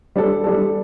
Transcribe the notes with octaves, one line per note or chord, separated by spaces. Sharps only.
G3 D4 A4
G3 D4 A4